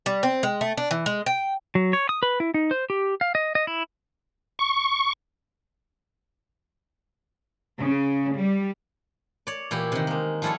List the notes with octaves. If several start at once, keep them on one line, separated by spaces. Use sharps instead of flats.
G3
C4
G#3
A3
D4
E3
G#3
G5
F#3
C#5
D#6
B4
E4
D#4
C5
G4
F5
D#5
D#5
E4
C#6
C#3
G3
C#5 D5
A#2 E3 E4 G4
C3 D#3
G#3 A#3
F3 G3 E4 F4 A4 C#5